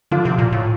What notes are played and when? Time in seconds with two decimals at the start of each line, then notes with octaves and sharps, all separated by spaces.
0.11 D3 F3 F4
0.25 C3
0.38 A#2
0.52 A2